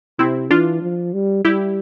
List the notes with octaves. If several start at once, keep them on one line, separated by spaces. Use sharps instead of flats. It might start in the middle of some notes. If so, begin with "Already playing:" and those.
C3 C4 E4
E3 D4 F4
F3
G3
G3 E4 G4